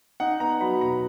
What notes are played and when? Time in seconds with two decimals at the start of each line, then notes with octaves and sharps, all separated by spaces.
0.20 D#4 F#5
0.40 B3 A#5
0.61 F#3 B5
0.81 B2 A#5